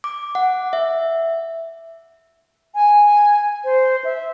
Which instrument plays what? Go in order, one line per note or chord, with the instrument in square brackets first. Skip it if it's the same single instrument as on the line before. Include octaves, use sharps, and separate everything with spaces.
[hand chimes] D6
F#5
E5
[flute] G#5
C5
E5